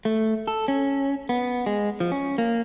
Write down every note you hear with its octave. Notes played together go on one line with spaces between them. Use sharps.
A3
A4
C#4
B3
G#3
F3
C#4
A#3